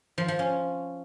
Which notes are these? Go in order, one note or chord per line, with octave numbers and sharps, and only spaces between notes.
F3
F3
C#4